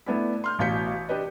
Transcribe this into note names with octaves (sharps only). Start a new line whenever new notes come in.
A3 B3 D4 E4
C6 F6 G6
A1 B2 F5 G6 B6 C#7
D4 G4 B4 D#5